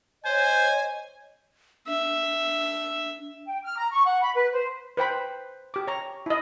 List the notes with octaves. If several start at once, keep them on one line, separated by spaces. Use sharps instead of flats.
C5 C#5 D#5 G#5
D4 E5
G5
F6
A#5
C#6
F#5
B5
B4
C5
B4 C5 G5 B5
G4 D6
C#5 A#5
E4 D#5